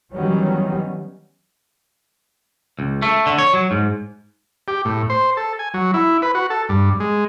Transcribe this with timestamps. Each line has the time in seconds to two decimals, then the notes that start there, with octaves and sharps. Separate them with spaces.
0.13 D#3 E3 F#3 G3 B3 C#4
2.79 C#2
3.02 A3
3.26 D3
3.38 C#5
3.53 F#3
3.71 G#2
4.68 G4
4.85 A2
5.10 C5
5.37 A4
5.59 G#5
5.74 F#3
5.94 E4
6.22 B4
6.35 F#4
6.50 A4
6.69 G2
7.00 G#3